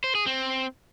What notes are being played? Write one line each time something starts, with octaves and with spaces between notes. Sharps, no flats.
C5
G#4
C4